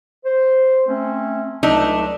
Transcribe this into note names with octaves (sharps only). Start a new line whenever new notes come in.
C5
A3 C4 C#4
C#2 F#3 A3 D4 D#4